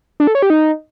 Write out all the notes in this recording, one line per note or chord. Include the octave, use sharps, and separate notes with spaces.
D4
A4
C#5
G4
D#4